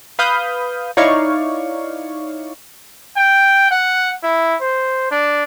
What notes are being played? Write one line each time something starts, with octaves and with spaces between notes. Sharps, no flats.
B4 F5 B5 D#6 G6
D#4 E4 C#5 D5 F5 C#6
G5
F#5
E4
C5
D4